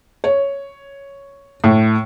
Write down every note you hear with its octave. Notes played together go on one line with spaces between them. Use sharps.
C#5
A2